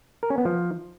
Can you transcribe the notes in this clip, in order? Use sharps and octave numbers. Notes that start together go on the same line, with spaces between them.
A#4
C#4
B3
F3